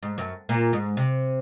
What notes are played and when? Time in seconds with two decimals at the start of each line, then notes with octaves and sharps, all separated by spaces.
0.03 G#2
0.18 F#2
0.49 A#2
0.73 G#2
0.97 C3